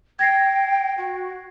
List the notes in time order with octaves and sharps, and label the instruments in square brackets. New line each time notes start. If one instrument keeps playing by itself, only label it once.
[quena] G5 [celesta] G#6 A#6 C7
[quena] F#4